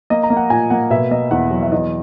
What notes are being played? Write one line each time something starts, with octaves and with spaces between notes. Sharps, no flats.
A#3 D#5
A#5
A#3
F#5
A#2 G#5
A#3 F#5
B2 E5
A#3 D#5
E2 F#5
F#3
E5
E2 D#5